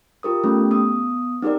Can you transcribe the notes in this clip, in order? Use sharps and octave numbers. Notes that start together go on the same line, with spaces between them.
F4 G4 A#4 D#6
A3 B3 C#4 G4
B3 D#6
C4 D#4 G4 A#4 D5